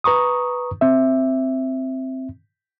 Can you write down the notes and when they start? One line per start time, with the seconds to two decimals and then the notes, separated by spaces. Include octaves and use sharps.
0.04 B4 A#5 C#6 D#6
0.81 C4 E5